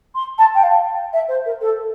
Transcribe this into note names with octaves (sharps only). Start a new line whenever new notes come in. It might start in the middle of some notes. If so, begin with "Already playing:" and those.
C6
A5
G5
F5
E5
C5
A#4
A4